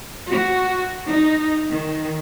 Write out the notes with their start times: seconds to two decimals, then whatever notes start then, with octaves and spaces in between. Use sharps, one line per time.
0.32 F#4
1.11 D#4
1.70 D#3